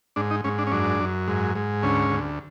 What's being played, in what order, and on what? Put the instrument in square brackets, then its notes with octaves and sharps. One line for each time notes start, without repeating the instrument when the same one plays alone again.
[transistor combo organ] G#2 D4
D#4
G#2 C#4
D4
C#4
F#2 D4
F#2
G#2
G#2
D2 C#4
D2